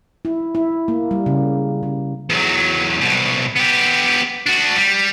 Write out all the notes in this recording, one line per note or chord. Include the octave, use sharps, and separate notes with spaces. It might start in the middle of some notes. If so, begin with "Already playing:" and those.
E4
E4
A#3
G3
C#3
C#3
E2 F#3
C2 B2
B3 G4
D4 F#4
G3